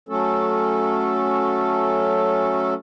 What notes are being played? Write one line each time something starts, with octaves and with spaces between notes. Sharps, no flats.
F#3 A3 C#4 A4